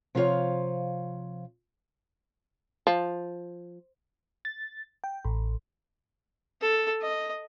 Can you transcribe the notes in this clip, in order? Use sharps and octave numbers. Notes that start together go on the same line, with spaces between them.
C3 F3 F4 F#4 C#5 F5
F3
A6
G5
A1
A4
D#5